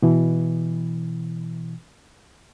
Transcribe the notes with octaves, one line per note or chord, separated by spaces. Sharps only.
B2 E3